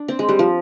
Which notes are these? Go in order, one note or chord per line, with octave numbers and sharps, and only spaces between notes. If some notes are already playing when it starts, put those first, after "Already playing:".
Already playing: D4
C4
G#3
G3
F3